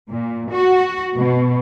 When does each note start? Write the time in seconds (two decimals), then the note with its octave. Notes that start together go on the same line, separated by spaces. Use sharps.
0.10 A#2
0.51 F#4
1.17 B2